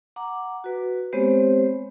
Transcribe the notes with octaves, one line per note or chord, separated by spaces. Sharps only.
F#5 A#5 D6
F#4 B4
G#3 B3 C4 G4 C5 C#5